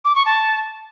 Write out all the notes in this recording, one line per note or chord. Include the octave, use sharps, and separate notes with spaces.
D6
C#6
A5